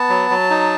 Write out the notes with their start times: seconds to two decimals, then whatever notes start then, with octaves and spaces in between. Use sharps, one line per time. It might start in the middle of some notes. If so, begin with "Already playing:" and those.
Already playing: B3 A5
0.09 F#3
0.30 F#3
0.50 D#4